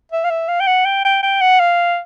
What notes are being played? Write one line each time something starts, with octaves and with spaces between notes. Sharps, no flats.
E5
F5
E5
F5
G5
F#5
G5
G5
G5
F#5
F5